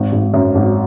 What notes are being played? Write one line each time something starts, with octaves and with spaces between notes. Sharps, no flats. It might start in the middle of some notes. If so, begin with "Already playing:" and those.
Already playing: G#1
G#1
F#2
G#1